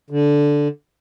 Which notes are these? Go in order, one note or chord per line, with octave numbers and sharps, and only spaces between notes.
D3